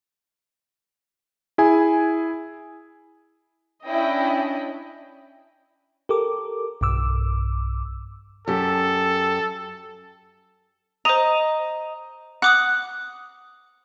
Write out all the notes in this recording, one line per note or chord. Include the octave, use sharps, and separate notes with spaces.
E4 G#4 G#5
C#4 D4 E4 D#5 G5
G4 A4 A#4 D6
B1 G2 D6 E6
F#2 G4 A4
C5 D#5 A#5
F#5 D6 D#6 F#6